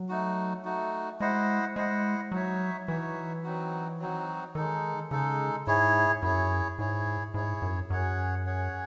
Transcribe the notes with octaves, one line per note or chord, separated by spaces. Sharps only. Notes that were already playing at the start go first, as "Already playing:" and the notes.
Already playing: F#3
A3 D#4 F#4
A3 D#4 F#4
G#3 E4 C5 D#5 F#5
G#3 E4 C5 D#5 F#5
F#3 D#4 F#4 C#5 E5
E3 D#4 F#4 C#5 E5
F#3 C4 D#4 F#4
F#3 C4 D#4 F#4
D#3 G#3 D#4 A4
C#3 G#3 D#4 A4
G#2 E4 G#4 C#5
F#2 E4 G#4 C#5
G#2 E4 G#4 C#5
G#2 E4 G#4 C#5
F#2
F#2 C#4 G#4 C#5 F#5
C#4 G#4 C#5 F#5